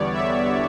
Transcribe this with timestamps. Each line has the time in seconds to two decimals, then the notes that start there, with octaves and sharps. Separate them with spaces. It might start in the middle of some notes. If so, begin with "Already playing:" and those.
Already playing: E2 D3 G3 B3 C#5 D5
0.13 E5